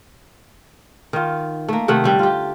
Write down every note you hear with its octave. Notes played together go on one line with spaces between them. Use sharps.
D#3 F4
A3 A#3
C3 D#3 A3 F#5
D3 G3
F4 G4